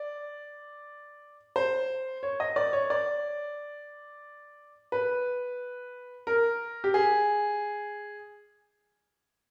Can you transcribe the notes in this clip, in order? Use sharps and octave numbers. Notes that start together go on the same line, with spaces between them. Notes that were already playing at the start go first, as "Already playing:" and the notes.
Already playing: D5
C5
C#5
D#5
D5
C#5
D5
B4
A#4
G4
G#4